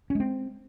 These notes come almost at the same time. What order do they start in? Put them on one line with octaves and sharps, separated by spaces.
C#4 G#3 C4